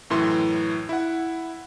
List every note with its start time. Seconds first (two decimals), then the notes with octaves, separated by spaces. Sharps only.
0.10 F#2 A2 E3 C6
0.89 E4 F#5